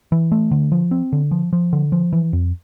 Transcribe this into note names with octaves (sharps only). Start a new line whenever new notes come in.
E3
A3
D3
F3
C4
D3
F3
F3
D3
F3
E3
F2